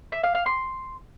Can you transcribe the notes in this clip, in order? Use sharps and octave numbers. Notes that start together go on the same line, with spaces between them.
E5
F5
F5
C6